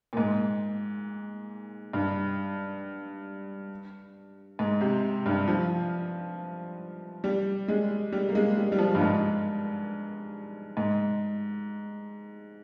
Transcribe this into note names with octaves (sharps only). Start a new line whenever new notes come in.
A#2
G#2
G2
G#2
C3
G2
F3
G3
G#3
G3
A#3
G#3
G3
G3
F3
G2
G#2
G#2